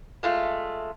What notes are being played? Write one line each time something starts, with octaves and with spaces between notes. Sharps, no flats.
G#3 A3 F4